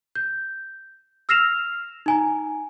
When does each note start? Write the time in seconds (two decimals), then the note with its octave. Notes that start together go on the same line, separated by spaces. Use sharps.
0.15 G6
1.29 E6 F6 A#6 C7 E7 F7
2.06 D#4 G#5 A#5